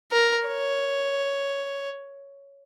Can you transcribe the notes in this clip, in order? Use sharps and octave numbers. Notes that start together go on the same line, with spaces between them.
A#4
C#5